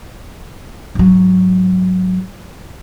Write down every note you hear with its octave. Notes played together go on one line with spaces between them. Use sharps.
G#2 F#3